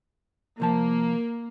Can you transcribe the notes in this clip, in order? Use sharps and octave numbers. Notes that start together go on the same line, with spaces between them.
C2 F3 A#3 A5